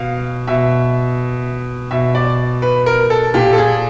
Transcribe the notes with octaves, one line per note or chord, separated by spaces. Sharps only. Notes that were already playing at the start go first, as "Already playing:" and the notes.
Already playing: B2 F5
B2 E5
B2 E5
D5
B4
A#4
A4
A#2 G4
A4
G#4